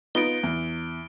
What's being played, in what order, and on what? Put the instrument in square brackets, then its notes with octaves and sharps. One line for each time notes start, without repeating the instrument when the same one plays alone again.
[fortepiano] B3 D#4 F4 [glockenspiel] D7 G7
[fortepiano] E2